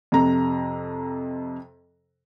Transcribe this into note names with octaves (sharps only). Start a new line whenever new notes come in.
F2 C3 A#5